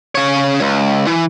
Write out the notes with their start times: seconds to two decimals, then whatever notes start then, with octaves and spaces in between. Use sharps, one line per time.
0.15 C#3 C#5
0.61 C#2
1.07 E3